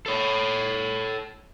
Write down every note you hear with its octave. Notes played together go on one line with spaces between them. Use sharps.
A4 C#5